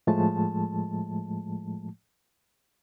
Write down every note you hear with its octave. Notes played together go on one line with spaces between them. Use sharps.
A2 F3 G#3 A3 A5